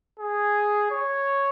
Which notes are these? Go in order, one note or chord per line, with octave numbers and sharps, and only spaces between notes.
G#4
C#5